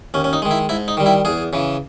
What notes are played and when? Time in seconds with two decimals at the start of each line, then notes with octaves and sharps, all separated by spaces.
0.14 D#2 C#4
0.24 C#4
0.33 D#4
0.42 D#3 G#3
0.51 E4
0.69 G#2 E4
0.88 D#4
0.97 D#3 G3
1.06 E4
1.25 E2 G#4
1.53 C#3 E3